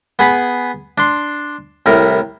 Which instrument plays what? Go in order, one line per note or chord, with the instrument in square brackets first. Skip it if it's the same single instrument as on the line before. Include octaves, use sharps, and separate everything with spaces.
[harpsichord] B3 G#4 B5
D4 C6
C2 A2 A#4